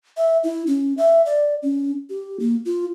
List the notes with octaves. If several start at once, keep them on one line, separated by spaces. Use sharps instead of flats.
E5
E4
C#4
E5
D5
C#4
G4
A#3
F4